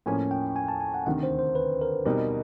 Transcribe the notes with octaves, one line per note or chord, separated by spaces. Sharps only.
A2 F3 A#3 C#4 G#5
G5
G#5
A5
G#5
F#5
D2 C3 D#3 F#5
C5
C5
B4
A#4
B2 G3 C4 D#4 A#4